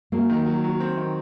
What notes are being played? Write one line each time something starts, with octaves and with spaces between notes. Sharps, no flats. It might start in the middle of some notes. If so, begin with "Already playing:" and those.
F#3 A#3
D#3
F#3
F#3
C4
D#3